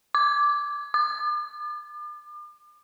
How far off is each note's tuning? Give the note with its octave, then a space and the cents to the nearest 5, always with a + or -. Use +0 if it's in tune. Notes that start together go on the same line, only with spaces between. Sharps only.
D6 -5
D6 +40